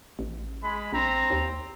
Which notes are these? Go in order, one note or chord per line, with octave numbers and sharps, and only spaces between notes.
A1
G#3 B5
A#1 C4 A#5
D#2